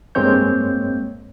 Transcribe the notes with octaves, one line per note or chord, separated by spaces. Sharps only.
G2 G#3 A#3 C4 C#5 G6